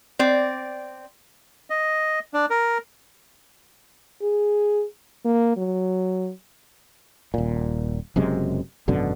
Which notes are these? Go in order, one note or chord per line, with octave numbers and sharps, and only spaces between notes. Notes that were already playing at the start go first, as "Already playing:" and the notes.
C4 D5
D#5
D4
A#4
G#4
A#3
F#3
D#1 A#2
F#1 F#2 C3 G#3
G#1 F#2 B2 D3